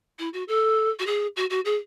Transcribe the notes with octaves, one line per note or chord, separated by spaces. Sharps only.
E4
F#4
A4
F#4
G#4
F#4
F#4
G#4